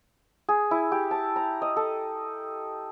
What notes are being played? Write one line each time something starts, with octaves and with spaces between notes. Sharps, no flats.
G#4
E4
G4
A5
A#5
D#5
A4